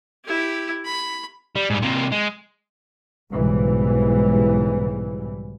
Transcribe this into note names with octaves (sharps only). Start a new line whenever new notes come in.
E4 G4
B5
G3
G#2 G3
C3 A#3
G#3
B1 G#2 C#3 E3 G3